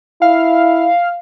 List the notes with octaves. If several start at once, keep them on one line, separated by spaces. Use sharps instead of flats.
E4 F5